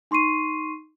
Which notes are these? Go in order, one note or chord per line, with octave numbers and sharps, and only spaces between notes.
D#4 C6 C#6 C7 D#7